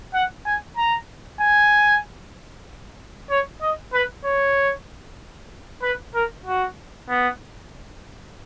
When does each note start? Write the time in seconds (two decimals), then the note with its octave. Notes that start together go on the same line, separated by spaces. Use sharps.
0.14 F#5
0.46 G#5
0.77 A#5
1.40 G#5
3.30 C#5
3.61 D#5
3.93 B4
4.24 C#5
5.83 B4
6.15 A#4
6.46 F#4
7.09 B3